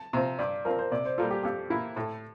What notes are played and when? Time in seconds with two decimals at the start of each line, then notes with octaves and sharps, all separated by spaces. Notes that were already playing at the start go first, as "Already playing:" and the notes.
Already playing: A5
0.13 C3 F3 C4 A#5
0.39 G2 D5
0.65 F3 C4 A#4
0.79 C5
0.92 C3 D5
1.05 C5
1.18 G3 A#3 F4 A4
1.31 G4
1.43 F2 G4
1.70 E3 A#3 E4
1.96 A2 A4